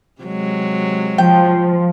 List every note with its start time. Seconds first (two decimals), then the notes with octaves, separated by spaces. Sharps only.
0.22 C3 F#3 G#3
1.18 F3 G5